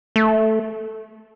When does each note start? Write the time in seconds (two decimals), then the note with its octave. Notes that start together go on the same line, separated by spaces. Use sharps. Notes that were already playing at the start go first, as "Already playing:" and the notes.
0.16 A3